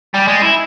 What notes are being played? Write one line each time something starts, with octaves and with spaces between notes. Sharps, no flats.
G3
G#3
E4